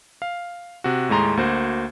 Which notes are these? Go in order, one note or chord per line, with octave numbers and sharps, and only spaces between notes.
F5
C3 F#4
D#2 A2 G#3 A#5 C6
D2 A#3 F#4 C5